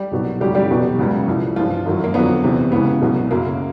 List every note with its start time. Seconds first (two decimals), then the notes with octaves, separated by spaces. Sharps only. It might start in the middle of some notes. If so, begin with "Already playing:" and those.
Already playing: G3 G4
0.11 C2 B2 F#3
0.41 F#2 C#3 F#3 G3 G4
0.55 G3 G4
0.70 E2 B2 F#3
0.99 C#2 C#3 F#3
1.27 C2 C3 F3
1.56 G2 E3 F3 F4
1.86 F#2 D#3 F#3
2.04 A#3
2.14 F2 D3 F#3 B3
2.43 E2 C3 E3
2.72 C#2 C#3 E3 B3
3.02 C2 B2 F#3
3.30 F#2 C#3 F#3 A#3